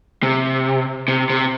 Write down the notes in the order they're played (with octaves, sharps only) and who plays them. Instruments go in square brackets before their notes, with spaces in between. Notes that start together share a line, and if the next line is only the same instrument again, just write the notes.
[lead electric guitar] C3
C3
C3